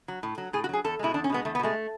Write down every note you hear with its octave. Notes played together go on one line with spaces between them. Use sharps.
F#3
A2
F#3
A2 G#4
F#4
F#3 G#4
E2 A4
B2 G#3 E4
E2 D4
C#4
B2 G#3 B3
E2 A3
B3
B2 G#3 A3